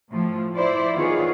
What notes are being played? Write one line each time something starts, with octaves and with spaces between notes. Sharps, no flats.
A2 F3
E4 C5 D5
D#3 E3 B3 F4 G#4 C#5